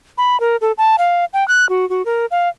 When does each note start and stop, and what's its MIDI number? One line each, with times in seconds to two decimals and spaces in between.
0.18 0.39 83
0.40 0.56 70
0.61 0.72 69
0.78 0.96 81
0.98 1.25 77
1.33 1.46 79
1.48 1.68 90
1.69 1.88 66
1.89 2.05 66
2.05 2.26 70
2.31 2.49 77